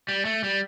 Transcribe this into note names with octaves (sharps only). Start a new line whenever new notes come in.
G3
A3
G3